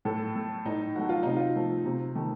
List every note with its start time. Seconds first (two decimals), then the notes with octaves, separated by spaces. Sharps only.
0.05 A2 A4
0.35 A3
0.65 A2 D#4
0.95 F#3 A3 F#4
1.09 F4
1.23 C3 D#4
1.36 F4
1.55 F3 A3
1.85 C3
2.15 D#3 A3